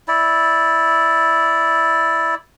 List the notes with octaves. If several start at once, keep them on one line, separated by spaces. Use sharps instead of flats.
E4 D5